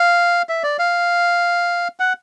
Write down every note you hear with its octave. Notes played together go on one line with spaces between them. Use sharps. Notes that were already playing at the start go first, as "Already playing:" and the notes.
Already playing: F5
E5
D5
F5
F#5